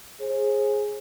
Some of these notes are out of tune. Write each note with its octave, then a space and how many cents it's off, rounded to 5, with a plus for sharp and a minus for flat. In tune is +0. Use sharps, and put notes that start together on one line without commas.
G#4 +0 C5 +35